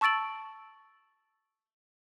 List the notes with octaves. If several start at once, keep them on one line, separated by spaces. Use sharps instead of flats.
A5 C#6 E6 A6 D7 F#7